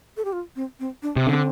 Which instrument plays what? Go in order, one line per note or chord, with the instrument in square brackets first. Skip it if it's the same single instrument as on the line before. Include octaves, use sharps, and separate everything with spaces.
[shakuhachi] A4
G4
F4
C4
C4
D4
[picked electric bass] C3
[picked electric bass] D3 [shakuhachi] C4